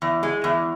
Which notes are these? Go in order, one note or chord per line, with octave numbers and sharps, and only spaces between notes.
E2
G#3
E2